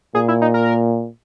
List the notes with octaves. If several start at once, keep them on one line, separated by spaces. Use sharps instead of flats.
A#2 G#4
E4
D#4
A#4